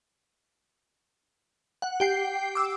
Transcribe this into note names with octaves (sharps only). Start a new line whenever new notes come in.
F#5
G4 G5 C7
D6 E6